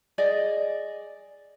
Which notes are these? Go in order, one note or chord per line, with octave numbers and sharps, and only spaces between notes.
G#4 D5 D#5